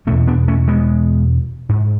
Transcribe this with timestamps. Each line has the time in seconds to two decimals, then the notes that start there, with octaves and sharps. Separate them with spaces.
0.07 E2 B2 A3 C#4
0.27 B3 D4
0.48 A3 C#4
0.68 G#3 B3
1.69 G#2